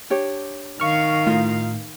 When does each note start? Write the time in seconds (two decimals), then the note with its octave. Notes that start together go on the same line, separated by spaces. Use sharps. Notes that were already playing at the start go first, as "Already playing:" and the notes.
0.10 D4 G4 C#5
0.80 D#3 F5 C#6 F6
1.27 A2 D#4 F4